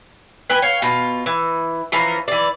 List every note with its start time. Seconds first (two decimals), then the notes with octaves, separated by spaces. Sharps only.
0.50 B4 G5 G#5
0.62 C#5 F5 G5
0.82 B2 F4
1.26 E3
1.92 E3 F3 C#4 A#4
2.28 E3 D5